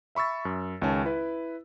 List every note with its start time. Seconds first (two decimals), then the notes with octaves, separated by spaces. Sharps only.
0.15 E5 B5 C#6 E6 A6
0.45 F#2
0.82 C#2 D#3 C#4 A5
1.05 E4 B4